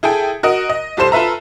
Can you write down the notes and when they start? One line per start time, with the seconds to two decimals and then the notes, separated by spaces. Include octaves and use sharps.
0.03 E4 G#4 A4 G5
0.43 F#4 A#4 D#5
0.70 D#5
0.97 C2 G3 A4 C5 E7
1.12 F4 A4 B4 E5 A#5